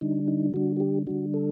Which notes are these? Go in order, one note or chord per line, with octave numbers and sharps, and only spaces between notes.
D3 G3 D4 D#4
D#4
D3 G3 D4 F#4
F#4
G4
D3 G3 D4 F#4
A4